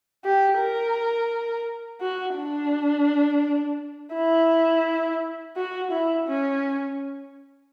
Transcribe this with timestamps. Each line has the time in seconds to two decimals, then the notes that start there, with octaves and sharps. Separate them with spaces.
0.25 G4
0.60 A#4
2.01 F#4
2.36 D4
4.14 E4
5.56 F#4
5.91 E4
6.28 C#4